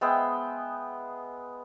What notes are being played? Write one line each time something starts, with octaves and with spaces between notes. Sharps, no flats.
G#3 B3 E5 G5